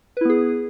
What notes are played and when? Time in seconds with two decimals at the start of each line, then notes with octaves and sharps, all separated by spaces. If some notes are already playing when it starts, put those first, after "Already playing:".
0.17 B4
0.21 E4
0.25 B3
0.30 G#4